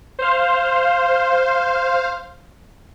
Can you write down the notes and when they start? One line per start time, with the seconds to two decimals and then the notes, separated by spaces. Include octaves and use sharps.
0.19 C5 F5